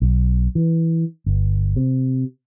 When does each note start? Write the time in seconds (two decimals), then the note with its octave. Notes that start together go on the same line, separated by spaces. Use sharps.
0.02 B1
0.55 E3
1.26 G1
1.76 C3